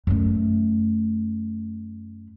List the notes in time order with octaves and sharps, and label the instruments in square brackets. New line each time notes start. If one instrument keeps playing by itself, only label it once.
[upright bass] F#2 A3